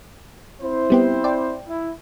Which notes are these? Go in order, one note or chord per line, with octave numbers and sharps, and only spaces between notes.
C4 E4 C5
G3 B3 G4
D5 G5
E4